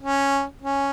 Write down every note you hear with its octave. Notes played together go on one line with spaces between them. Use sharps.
C#4
C#4